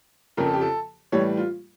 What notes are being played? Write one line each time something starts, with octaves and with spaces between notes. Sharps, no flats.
F2 C#3 F3 A#4
A4
G4
A4
A2 E3 G3 C#5
F4